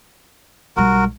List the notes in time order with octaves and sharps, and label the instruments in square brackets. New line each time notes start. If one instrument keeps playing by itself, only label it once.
[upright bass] B1 G3 [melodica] F#4 A#4